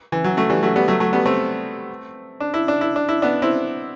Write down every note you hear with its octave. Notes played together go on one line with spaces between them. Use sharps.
E3
F#3
F#3 A3
E3 G3
F#3 A3
G3 B3
F#3 A3
F#3 A3
G3 B3
A3 C4
D4
E4
D4
E4
D4
E4
B3 D4
C4 E4